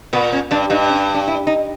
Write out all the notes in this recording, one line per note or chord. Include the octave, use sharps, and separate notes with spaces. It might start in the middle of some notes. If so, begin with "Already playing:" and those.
A#2 B3
C#4
G2 D4
G2 D#4
C#4
D4
E4
D#4